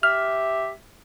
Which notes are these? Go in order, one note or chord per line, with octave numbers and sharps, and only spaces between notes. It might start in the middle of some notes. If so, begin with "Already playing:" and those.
G4 E5 F6